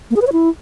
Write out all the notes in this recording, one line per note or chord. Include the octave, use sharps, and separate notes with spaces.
A#3
G#4
B4
C#5
E4